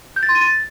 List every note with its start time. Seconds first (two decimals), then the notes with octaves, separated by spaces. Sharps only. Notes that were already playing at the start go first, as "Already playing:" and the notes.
0.16 G6
0.23 A6
0.29 C6
0.35 D#7
0.41 A6